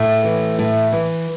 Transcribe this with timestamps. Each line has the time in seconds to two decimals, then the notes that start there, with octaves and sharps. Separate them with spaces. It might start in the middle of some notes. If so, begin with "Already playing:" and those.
Already playing: A2 A3
0.24 E3
0.59 A2
0.92 E3